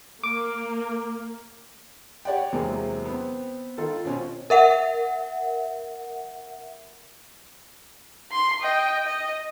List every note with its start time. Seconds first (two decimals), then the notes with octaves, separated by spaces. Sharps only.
0.24 A#3 D6
2.25 G4 C#5 D5 F#5 G5
2.52 E2 C3 F#3 G#3 A#3 C4
3.06 B3 C4
3.78 D#3 F4 A4
4.05 B2 C4 C#4 F4 F#4
4.50 A#4 E5 F#5
8.32 C6
8.61 D#5 G5
9.06 D#5